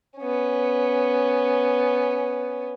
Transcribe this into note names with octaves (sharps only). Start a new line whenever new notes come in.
B3 C#4